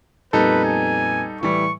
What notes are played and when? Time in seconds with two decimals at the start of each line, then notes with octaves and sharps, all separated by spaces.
0.33 F2 A#2 G3 B3 D#4 A4 B4
0.64 G#5
1.41 A2 E3 G3 C#6